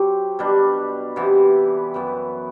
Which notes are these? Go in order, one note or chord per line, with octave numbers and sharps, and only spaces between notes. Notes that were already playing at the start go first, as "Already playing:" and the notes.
Already playing: F#3 C4 G4
B2 G3 D4
C3 E3 B3
F#2 E3 B3